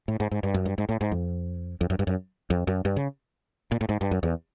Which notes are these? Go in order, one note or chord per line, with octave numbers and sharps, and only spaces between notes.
A2
G#2
G#2
G2
F#2
G2
G#2
A2
G#2
F2
F2
F#2
G2
F#2
F2
F#2
G2
C#3
A#2
A2
G#2
G2
F#2
E2